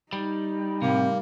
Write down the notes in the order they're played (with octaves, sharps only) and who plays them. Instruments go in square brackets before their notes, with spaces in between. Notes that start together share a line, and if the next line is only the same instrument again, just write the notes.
[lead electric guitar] G3 [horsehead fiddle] D#4
[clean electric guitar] A2 C3 [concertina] A#3